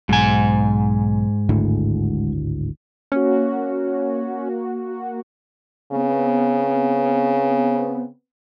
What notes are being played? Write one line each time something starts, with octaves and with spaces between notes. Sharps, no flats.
B1 G#2 G#5
G#1 D2 A2
A#3 C#4 F#4
C#3 B3 C4